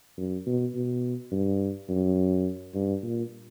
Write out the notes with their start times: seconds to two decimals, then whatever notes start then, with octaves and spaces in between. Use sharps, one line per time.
0.17 F#2
0.46 B2
0.75 B2
1.32 G2
1.89 F#2
2.74 G2
3.02 A#2